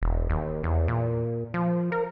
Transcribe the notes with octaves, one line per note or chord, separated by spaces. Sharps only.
E1
D#2
E2
A#2
F3
A#4